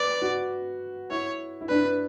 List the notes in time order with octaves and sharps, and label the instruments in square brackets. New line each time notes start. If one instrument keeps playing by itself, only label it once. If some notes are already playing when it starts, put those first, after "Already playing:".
Already playing: [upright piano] B4 [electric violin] D5
[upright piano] F#4
[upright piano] E4 [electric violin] C#5
[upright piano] E4
[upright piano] D4 [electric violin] B4